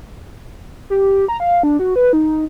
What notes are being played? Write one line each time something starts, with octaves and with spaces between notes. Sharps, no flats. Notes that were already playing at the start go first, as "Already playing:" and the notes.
G4
A#5
F5
D4
F#4
B4
D#4